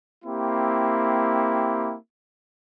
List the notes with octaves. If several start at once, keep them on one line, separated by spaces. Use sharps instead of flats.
A#3 C4 E4 G4